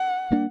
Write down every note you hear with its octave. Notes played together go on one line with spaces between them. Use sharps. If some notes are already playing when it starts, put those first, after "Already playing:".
Already playing: F#5
G3 A#3 D4